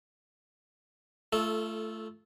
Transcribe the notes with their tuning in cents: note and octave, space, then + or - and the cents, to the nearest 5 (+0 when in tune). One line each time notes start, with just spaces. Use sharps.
A3 +0 F4 -30 A4 -15